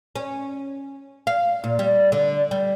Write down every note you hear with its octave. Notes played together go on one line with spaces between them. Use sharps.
C#4
F5
A#2
G3
D3
G3